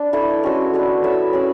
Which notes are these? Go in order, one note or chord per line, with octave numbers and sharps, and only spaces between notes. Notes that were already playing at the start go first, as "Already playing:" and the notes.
Already playing: D4 B4
A3 E4 A4
G#3 C#4 F#4 A4
B3 D4 A4
E4 A4 C#5 E5
C#4 G#4 D5